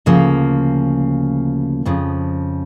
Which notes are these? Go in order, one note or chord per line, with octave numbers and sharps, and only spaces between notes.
D2 C#3 F3 A#3
F2 C#3 F3